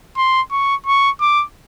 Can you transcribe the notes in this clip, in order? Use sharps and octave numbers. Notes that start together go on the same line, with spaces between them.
C6
C#6
C#6
D6